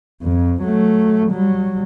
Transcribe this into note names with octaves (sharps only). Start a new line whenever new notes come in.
F2
F#3 A3
F#3 G3